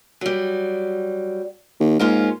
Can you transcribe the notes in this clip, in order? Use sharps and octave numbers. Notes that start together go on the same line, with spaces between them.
F#3 G3
D#2
G#2 A#3 C#4 F4